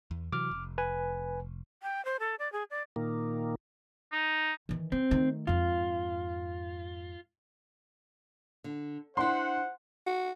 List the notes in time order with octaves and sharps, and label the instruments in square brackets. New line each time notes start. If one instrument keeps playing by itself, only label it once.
[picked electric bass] E2
[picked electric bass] C3 E3 F#3 [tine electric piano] D6 F6
[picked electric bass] F1
[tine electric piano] B4 G#5
[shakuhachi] G5
C5
A4
D5
G#4
D5
[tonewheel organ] A#2 D#3 A#3
[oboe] D#4
[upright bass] D#3 E3
[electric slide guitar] C4 [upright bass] C#4
[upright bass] D#3 A3
[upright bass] F2 G#2 [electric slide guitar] F4
[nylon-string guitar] D3
[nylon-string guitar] D4 E4 [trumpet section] C5 F#5 [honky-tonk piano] C6
[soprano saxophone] F#4